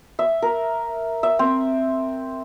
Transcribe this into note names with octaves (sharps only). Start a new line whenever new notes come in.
E5
A#4
E5
C4